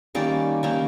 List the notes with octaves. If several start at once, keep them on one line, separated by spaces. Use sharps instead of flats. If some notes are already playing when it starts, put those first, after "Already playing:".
D#3 G3 A#3 C#4 D5
D#3 G3 A#3 C#4